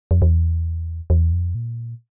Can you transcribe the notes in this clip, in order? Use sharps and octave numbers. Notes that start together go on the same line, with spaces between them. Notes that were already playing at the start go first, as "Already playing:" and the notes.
F2
E2
E2
F2
A#2